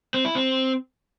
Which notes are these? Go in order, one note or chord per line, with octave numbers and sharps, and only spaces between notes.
C4
E4
C4